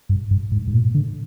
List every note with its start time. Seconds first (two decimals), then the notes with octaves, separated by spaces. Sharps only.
0.09 G2
0.31 G2
0.52 G#2
0.67 G#2
0.73 A#2
0.95 D3